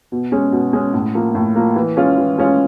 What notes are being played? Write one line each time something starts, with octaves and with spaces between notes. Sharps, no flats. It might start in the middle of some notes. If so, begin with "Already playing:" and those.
B2
G#3 C#4
B2
G#3 C#4
A2
F3 A#3
A2
F3 A#3
E3
G#3 C#4 F4
E3
G#3 C#4 F4